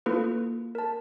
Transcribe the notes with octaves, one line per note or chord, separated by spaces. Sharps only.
A#3 E4 F4 A4 B4
A#4 A5